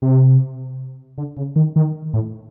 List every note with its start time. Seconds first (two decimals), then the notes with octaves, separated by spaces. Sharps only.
0.02 C3
1.18 D3
1.37 C#3
1.56 D#3
1.76 D#3
2.13 A2